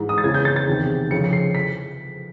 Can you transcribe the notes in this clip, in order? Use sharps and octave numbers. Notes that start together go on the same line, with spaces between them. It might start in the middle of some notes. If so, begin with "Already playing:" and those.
Already playing: G#2 E3
D#6
A6
E2 C#3 E3 G#6
G6
A6
A6
E2 C3 D#3
F2 C#3 E3 C#7
C#7
C7
B6